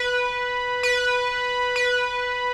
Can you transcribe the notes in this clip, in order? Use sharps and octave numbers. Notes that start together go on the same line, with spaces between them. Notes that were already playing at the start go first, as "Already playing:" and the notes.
Already playing: B4
B4
B4